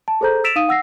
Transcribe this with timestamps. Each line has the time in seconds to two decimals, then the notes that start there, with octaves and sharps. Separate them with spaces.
0.08 A5
0.21 G#4 A4 C5 A#5 G6
0.44 E6 A6 B6 D7 E7 F7
0.56 D#4 F5 D#6 D#7
0.69 F#5 E6 A#6 C7